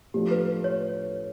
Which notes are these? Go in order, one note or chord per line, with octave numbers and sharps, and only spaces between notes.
A2 F3 A3 D4 G4
B4
C#5